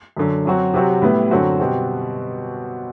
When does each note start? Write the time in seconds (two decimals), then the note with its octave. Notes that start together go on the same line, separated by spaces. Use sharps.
0.17 F#2 D3 F#3
0.45 F#2 F#3 C4 F#4
0.74 C3 F#3 C4 F#4
1.02 A2 G3 B3 E4
1.31 F#2 D3 F#3 C4 F#4
1.60 B2 G3 C4 F#4